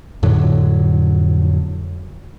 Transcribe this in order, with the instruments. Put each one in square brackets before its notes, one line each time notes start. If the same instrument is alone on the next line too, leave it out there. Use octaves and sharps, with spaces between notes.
[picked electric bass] F2 A2 D3 F#3